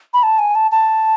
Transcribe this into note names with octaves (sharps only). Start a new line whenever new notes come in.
B5
A5
G#5
A5
A5